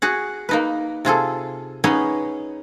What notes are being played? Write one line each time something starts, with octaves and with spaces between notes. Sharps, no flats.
F#4 G#4 F#5
A#3 D#4 B4
C3 F4 G#4 A4
B3 C#4 D#4 G#4